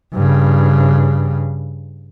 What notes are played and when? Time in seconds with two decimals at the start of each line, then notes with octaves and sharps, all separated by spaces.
0.14 G2 C#3